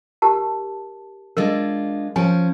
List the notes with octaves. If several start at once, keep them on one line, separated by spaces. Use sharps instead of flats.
G4 A#4 A5
G#3 D4 F4 A#4
F3 C#4 C5 G#5